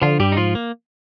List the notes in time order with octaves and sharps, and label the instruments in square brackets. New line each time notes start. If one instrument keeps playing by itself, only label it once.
[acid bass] D3 [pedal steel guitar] F3 F4
[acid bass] G2 [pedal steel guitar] G3 G4
[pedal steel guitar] D#4
[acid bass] G#2 [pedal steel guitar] F3 F4
[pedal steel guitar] A#3